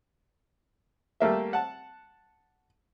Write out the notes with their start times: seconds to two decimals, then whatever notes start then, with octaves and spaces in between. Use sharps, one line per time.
1.20 G3 A3 A#3 E5
1.53 F#5 A5